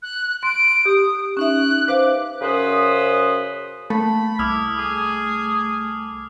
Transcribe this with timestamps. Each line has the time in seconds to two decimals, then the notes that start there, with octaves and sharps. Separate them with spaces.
0.03 F#6
0.43 C6 D7
0.85 G4 D#6
1.37 C#4 D#4 E5 F#6
1.88 B4 C5 F5 D6
2.42 F#2 C#3 B4 C5 D#6
3.90 A3 A#3 B5
4.39 C2 E4 D6 D#6 F6
4.78 G#4